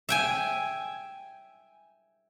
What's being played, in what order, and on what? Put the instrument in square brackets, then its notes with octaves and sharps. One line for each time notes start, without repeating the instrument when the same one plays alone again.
[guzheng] E5 G5 G#5